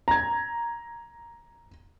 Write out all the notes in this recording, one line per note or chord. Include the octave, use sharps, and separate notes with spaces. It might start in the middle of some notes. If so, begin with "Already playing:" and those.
A#5 G#6